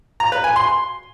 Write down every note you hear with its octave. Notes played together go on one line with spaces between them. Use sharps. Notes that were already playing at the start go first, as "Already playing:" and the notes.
A#5
B4
G#5
C6